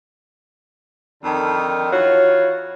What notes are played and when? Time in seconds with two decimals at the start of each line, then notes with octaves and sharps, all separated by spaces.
1.24 F2 D3 D#3
1.92 E3 F4 F#4 C#5